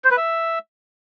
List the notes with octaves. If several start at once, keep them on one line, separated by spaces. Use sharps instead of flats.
C5
B4
E5